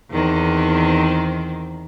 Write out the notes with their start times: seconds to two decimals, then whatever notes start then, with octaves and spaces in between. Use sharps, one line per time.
0.11 E2 D#3 C4